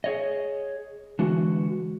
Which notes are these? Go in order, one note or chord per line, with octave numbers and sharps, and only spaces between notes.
G#4 C#5 D#5
D3 E3 G#3 F#4